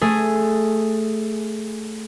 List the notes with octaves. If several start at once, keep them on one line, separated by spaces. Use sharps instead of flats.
A3 G#4